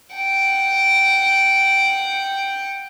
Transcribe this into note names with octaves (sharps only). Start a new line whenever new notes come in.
F#5 G5